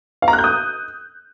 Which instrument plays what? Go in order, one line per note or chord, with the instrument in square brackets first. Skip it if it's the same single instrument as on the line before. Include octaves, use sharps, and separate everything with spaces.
[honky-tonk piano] F5
A#5
F#6
G6
D#6